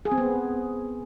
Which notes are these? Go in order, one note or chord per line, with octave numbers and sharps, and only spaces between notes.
G#4
C4
B3